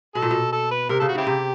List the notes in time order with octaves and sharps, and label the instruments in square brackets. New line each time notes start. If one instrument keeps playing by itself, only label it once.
[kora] B2 [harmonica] A4
[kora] A#2
B2
[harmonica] A4
B4
[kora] C3 [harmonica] A#4
[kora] C#3 [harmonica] A4
[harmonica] F#4
[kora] C#3 [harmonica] C4 E4 G4
[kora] C3